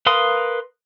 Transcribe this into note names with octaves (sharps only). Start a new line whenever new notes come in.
A#4 B4 F5 C6 D#6